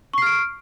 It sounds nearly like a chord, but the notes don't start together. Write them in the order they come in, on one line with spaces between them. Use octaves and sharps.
C#6 C7 F6 D7